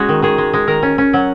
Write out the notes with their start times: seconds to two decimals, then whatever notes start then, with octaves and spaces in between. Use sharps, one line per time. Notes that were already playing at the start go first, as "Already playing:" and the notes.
Already playing: G#3 C#4 F#4
0.09 D#3
0.22 D#3 G#4
0.38 G#3
0.53 G#3
0.67 D#3 A#4
0.83 C#4
0.98 C#4
1.13 F#3